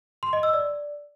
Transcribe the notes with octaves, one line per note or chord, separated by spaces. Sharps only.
C6
D#5
E6
D5